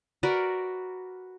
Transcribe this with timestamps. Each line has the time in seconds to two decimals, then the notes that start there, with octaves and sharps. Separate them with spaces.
0.23 F#4 A#4 B4 D5